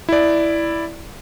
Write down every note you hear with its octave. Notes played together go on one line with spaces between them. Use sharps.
E4 D5